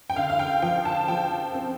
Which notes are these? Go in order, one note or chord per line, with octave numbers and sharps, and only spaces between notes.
G5
D3 F5
F5
G5
F3 G5
A5
F3 G5
C4